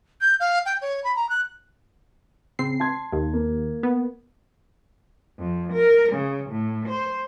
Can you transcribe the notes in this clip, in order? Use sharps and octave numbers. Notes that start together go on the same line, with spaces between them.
G6
F5
G5
C#5
B5
A#5
F#6
C#3 C4 C7
A5 C6 G#6
D#2
A#3
B3
F2
A#4
C#3
A2
C5